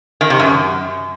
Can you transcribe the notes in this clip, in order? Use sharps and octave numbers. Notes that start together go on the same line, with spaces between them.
D#3
C3
F#2